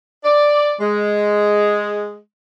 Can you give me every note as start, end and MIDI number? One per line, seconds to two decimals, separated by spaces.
0.25 0.75 74
0.81 2.18 56